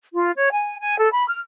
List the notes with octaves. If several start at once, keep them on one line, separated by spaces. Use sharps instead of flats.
F4
C#5
G#5
G#5
A4
B5
F6